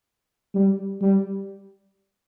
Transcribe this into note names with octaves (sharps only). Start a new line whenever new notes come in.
G3
G3